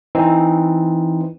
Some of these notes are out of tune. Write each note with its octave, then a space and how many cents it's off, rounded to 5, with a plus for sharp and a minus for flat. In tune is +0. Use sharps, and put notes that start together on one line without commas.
E3 -5 C4 +0 D#4 +0